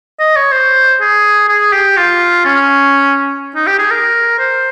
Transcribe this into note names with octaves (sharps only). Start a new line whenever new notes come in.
D#5
C#5
C5
G#4
G#4
G4
F4
C#4
D#4
G4
G#4
A#4
C5